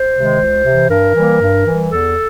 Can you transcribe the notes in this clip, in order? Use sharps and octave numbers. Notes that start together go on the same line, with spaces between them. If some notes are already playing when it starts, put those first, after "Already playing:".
Already playing: C5
C3 D#3 G#3
C#2
C3
E3
G2 A#4
E3 G3 A#3
G2
E3 G3
E2 A4